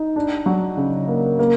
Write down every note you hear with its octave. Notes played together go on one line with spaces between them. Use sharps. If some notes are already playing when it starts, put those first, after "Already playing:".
Already playing: D#4
D4
F#3
C#3
A#3
A#3